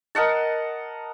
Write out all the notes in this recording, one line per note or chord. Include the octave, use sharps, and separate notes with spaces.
A#4 D#5 F#5 A5